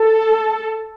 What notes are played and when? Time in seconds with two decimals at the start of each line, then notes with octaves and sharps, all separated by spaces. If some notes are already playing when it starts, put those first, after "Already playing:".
Already playing: A4